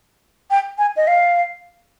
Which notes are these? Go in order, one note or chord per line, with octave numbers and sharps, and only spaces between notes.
G5
G#5
D#5
F5